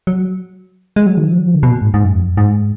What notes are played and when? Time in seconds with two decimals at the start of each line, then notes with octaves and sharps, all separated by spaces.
0.07 F#3
0.96 G#3
1.06 F#3
1.17 D#3
1.28 F3
1.38 F#3
1.47 F3
1.55 D3
1.63 B2
1.71 A#2
1.82 G#2
1.94 G#2
2.05 F#2
2.16 F2
2.27 F#2
2.37 G#2